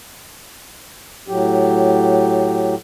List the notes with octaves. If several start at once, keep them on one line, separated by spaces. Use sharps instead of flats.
A2 F#3 G4